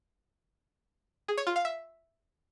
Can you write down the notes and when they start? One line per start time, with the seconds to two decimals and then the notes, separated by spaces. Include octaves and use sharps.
1.28 G#4
1.38 C#5
1.47 F4
1.56 F5
1.65 E5